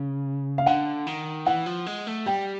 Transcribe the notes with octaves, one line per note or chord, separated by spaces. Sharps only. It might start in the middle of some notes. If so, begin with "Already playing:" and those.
Already playing: C#3
F5
D3 F#5
D#3
E3 F#5
F3
G#3
A3
G3 G5